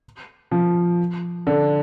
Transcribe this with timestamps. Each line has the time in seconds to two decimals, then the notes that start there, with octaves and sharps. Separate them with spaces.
0.51 F3
1.47 D3